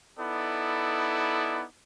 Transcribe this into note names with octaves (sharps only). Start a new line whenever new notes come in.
B3 D#4 E4 A4 D5